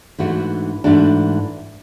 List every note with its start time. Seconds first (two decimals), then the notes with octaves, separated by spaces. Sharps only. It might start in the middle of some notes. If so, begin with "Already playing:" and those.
0.19 G#2 E3 A3 D4 F#4
0.84 G#2 E3 A3 D4 F#4